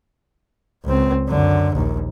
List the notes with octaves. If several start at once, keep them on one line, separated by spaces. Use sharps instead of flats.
C#2 C4
F#2 D3
A#1 D#2